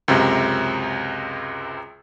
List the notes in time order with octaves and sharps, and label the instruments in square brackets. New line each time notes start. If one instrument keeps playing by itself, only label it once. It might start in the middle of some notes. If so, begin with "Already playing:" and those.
[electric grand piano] C#2 F#2 C3